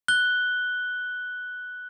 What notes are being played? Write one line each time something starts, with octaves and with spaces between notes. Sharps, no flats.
F#6 G7